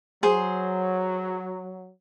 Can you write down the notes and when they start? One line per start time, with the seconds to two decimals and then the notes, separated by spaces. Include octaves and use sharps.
0.23 F#3 G#4 C5